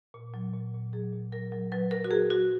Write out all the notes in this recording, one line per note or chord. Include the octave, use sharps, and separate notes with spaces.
A#2
F#3
A#2
A#2
F#3 G#4
A#2
F#3 A#4
F#3
F#3 B4
F#3 A#4
F#4
F#3 G#4
F#3 F#4